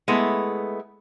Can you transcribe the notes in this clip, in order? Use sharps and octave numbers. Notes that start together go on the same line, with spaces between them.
G#3 A3 B3 E4